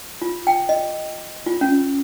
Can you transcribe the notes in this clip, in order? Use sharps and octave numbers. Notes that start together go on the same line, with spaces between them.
F4
G5
D#5
F4
C#4